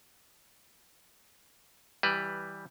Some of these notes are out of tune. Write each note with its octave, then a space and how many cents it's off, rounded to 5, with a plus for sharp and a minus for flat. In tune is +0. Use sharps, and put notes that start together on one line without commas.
E3 -10 G3 +0 B4 +0